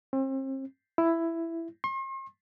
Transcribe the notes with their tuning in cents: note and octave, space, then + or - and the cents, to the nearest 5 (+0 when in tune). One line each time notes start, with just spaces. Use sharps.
C4 +40
E4 +10
C6 +45